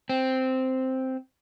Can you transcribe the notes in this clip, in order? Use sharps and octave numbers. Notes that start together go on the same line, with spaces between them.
C4